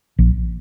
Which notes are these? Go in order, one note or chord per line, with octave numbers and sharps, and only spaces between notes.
A#1